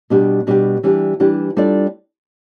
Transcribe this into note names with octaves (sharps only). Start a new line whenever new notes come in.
B2 G3 D4 G4
B2 G3 D4 G4
E3 G3 D4 G4
E3 G3 D4 G4
G3 D4 F4 A4 D5